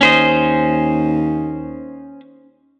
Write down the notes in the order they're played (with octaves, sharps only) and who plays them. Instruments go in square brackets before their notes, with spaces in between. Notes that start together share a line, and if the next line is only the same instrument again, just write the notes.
[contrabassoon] D#2 [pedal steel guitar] C#4 C5 D#5